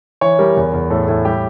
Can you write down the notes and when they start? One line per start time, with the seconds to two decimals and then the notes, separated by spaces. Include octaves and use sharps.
0.21 E3 C#5
0.39 G3 A#4
0.57 E2
0.74 E2
0.90 A2 A4
1.08 A2
1.25 G3 G4